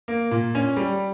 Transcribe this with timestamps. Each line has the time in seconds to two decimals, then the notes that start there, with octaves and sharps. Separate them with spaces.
0.08 A#3
0.31 A#2
0.55 C#4
0.77 G3